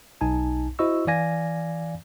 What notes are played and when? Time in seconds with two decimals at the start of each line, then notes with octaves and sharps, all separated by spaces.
0.21 B1 D#4 G#5 A5
0.79 E4 F#4 C5 D#5 C#6 E6
1.07 E3 D5 F5 G#5 A#6